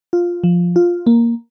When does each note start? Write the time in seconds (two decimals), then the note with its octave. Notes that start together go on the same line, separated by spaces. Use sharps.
0.13 F4
0.44 F3
0.76 F4
1.07 A#3